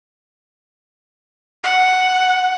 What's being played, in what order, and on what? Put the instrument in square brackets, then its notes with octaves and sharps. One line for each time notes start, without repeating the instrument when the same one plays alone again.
[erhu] F#5